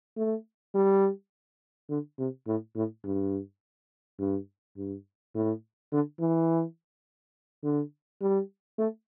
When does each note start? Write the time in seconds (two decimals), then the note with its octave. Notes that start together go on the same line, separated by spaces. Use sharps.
0.17 A3
0.75 G3
1.90 D3
2.19 C3
2.47 A2
2.76 A2
3.04 G2
4.19 G2
4.77 G2
5.35 A2
5.92 D3
6.20 E3
7.63 D3
8.22 G3
8.78 A3